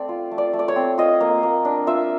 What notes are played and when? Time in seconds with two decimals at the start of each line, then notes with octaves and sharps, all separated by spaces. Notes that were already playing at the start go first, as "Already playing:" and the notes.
Already playing: A3 C4 D5
0.09 F4
0.31 A3
0.38 D5
0.53 A3
0.59 D5
0.68 C#5
0.76 C4
0.98 F4 D#5
1.20 A#3
1.43 A#3
1.65 D4
1.87 F4 E5